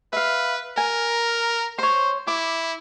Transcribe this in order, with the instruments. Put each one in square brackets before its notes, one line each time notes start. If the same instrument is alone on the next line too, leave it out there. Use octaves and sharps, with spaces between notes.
[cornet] B4 [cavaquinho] E5 F5
[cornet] A#4 [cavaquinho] G#5
[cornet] C5 [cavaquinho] C#5 C6
[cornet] E4 [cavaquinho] D6